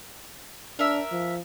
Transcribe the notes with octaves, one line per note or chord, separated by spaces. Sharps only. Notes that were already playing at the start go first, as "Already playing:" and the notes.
D4 A#4 E5
F3